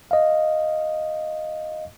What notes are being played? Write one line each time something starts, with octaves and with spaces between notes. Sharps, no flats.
D#5 F5